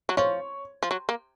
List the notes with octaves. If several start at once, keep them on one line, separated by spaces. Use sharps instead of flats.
F#3
F3 C#5
F3
F#3
A#3